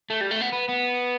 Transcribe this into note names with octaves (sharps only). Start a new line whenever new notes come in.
A3
G3
A3
B3
B3
B3